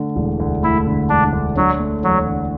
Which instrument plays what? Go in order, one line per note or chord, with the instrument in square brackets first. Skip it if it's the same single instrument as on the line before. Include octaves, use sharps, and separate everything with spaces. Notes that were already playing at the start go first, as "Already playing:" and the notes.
Already playing: [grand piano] D3 A3
E1
D2
[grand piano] A3 [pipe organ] E4
[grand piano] D3
[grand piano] E1 [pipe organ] D4
[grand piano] D2
[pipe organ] F#3 [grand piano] D4
[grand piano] A3
[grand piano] E2 [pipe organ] F#3
[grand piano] D3